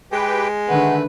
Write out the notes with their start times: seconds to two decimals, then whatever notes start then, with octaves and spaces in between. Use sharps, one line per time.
0.12 G#3 G4 B4 G5
0.69 D3 D#3 A3 B4 F#5